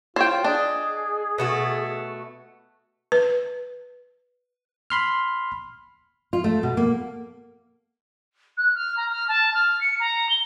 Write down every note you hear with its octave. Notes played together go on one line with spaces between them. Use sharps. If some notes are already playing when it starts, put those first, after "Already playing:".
F4 C5 C#5 G5
D4 G#4 D#5
B2 A3 F#4
B4
B5 C6 F6
F4
A3
B2
A#3
F#6
F6
A#5
F6
A5
F6
C#7
A#5
G7